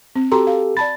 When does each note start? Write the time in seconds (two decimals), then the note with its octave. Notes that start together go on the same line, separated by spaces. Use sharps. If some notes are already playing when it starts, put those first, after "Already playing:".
0.15 C4
0.32 F#4 G4 A4 A#5 C6
0.47 F5
0.77 D5 A5 B5 A6